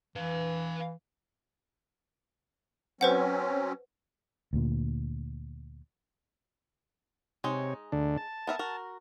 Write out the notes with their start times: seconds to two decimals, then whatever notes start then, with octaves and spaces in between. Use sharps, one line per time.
0.16 E3 B4 F5
3.01 F#3 C4 C#4 B4 C5 F#5
4.53 D2 A#2
7.44 C3 G#3 D#4 C#5
7.92 D2 D3 D4
8.17 A5
8.47 B3 A#4 E5
8.59 F#4 A#4